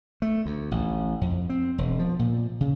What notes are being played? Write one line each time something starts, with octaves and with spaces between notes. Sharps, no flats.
A3
D2
A1
F2
C4
E1
F3
A#2
C#3